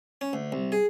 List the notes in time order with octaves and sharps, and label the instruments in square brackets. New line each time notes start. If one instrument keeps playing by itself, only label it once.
[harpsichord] C#4
D2
C2
G#4